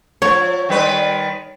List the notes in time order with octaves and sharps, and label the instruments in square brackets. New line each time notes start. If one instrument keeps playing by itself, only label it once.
[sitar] F3 [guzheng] C#5
[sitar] D#3 G3 B4